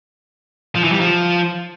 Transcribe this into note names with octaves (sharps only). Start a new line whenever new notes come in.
F3
E3
G3
F3